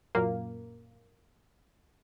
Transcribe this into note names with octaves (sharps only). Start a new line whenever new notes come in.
F#2 A#2 A#3